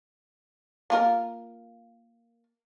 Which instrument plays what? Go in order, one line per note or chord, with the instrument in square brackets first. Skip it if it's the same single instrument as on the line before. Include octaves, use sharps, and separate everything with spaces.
[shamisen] A#3 F4 A#4